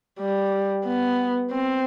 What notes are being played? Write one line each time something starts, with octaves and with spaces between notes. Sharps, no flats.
G3
B3
C4